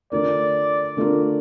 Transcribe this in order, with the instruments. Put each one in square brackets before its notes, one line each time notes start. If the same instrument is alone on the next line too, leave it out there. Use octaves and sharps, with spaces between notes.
[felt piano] D3 A3 D4 F4 A#4 [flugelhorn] D5
[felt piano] D3 A3 D4 F4 A#4